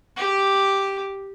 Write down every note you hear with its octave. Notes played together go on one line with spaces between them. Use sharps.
G4